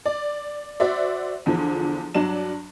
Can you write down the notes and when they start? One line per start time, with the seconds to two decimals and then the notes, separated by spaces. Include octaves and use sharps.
0.06 D5
0.80 F#4 C5 D5 E5
1.46 E2 D3 F3
2.15 G2 F#3 D4 E7